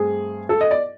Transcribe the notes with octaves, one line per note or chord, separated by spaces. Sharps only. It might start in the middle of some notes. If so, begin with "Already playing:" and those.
Already playing: G2 A3 C4 G#4
A4
D#5
D5